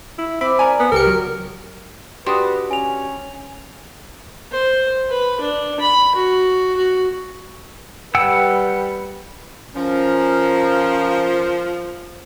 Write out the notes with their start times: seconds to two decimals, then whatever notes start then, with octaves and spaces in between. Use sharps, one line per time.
0.18 E4
0.41 C4 E5 B5 D6
0.59 A#4 D5 G#5
0.80 B3
0.92 C#2 G4 A#4 C#7
1.07 F#3
2.27 D4 F#4 G4 B4 C6 D#6
2.71 C#4 G#5 F7
4.52 C5
5.10 B4
5.40 D4
5.80 B5
6.15 F#4
6.77 F#4
8.15 G3 B4 F#5 G5 E6
9.75 F3 C#4 A#4